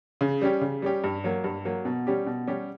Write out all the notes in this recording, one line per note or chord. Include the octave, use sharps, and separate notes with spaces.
C#3
G3 C#4 G4
C#3
G3 C#4 G4
G2
F#3 A#3
G2
F#3 A#3
B2
G3 C#4 G4
B2
G3 C#4 G4